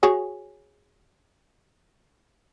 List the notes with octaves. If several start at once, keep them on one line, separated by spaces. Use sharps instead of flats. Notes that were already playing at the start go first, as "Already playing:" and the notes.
F#4 G#4 C#5